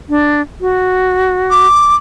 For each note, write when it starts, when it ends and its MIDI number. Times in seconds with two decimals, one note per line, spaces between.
0.09 0.41 62
0.61 1.67 66
1.51 1.95 86